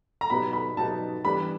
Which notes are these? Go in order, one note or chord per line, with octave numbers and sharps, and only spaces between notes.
A#5
B2 F#3 B3 D#4 G4 B5
B5
B2 F#3 B3 D#4 G4 A5
E3 G3 B3 D4 G4 B5